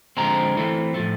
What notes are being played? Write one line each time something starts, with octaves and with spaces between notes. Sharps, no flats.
D3 F3 G#3 C4 A#5
E3 A3 C4 E4
A2 F3 A3